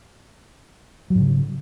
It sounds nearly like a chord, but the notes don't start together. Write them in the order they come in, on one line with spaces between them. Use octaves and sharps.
F#3 G#2 C#3